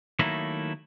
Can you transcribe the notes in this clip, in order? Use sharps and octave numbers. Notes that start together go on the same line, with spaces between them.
D#3 F#3 A3 A#3 D#4 E4